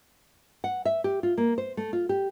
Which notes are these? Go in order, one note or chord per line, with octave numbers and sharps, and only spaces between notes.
F#5
E5
G4
F4
A#3
C5
A3
F4
G4